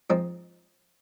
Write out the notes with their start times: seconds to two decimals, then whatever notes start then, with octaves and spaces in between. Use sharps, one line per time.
0.10 G#2 F3 C4 D#4